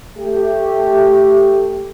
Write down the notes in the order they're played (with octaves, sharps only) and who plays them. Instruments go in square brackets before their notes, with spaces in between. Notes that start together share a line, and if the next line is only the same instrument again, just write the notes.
[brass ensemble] A3 G4